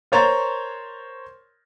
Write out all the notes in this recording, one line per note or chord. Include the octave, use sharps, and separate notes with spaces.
A#4 C5 C#5 A#5 C6 A6